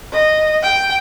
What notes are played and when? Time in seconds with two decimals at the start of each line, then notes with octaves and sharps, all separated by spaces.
0.12 D#5
0.63 G5